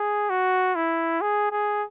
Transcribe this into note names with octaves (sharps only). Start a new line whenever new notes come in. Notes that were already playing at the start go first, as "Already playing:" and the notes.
Already playing: G#4
F#4
E4
G#4
G#4